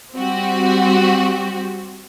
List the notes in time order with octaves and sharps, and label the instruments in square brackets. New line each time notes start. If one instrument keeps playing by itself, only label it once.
[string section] G3 C4 F#4 G4